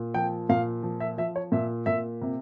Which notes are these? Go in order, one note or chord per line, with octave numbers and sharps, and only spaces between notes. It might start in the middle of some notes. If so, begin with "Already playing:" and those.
Already playing: A#2
F3 G5
A#2 F5
F3
E5
F3 E5
C#5
A#2 E5
A#2 E5
C3